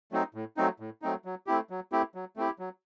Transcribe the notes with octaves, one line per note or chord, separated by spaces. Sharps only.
F#3 A3 C4 D#4
A2
F#3 A3 C4 D#4
A2
F#3 A3 C4 D#4
F#3
A3 C4 E4 G4
F#3
A3 C4 E4 G4
F#3
A3 C4 E4 G4
F#3